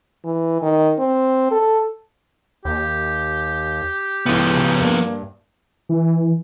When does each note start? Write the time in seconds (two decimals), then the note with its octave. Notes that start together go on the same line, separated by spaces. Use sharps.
0.24 E3
0.62 D#3
0.99 C4
1.51 A4
2.65 D#2 G4
4.26 C#2 A2 F3 B3
4.56 C#3
4.80 G2 A#3
5.89 E3